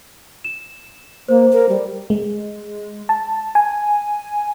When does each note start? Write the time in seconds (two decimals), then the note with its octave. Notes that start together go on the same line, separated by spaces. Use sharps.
0.44 E7
1.28 A#3 C5
1.52 A#4
1.69 G3
2.10 G#3
3.09 A5
3.55 G#5